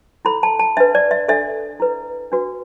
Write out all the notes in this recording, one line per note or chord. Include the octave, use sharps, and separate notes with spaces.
E4 A4 B5
A5
A5
D4 B4 E5
D5
E5
D4 A4 E5
E4 B4
D4 F#4 B4